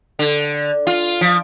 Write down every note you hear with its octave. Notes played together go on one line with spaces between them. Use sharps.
D3
F4
F3